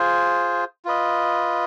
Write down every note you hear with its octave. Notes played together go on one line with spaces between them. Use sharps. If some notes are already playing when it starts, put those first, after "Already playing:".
Already playing: F4 G#4 C5
F4 B4 D#5